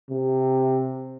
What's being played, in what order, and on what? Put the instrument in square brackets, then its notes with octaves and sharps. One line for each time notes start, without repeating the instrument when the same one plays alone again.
[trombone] C3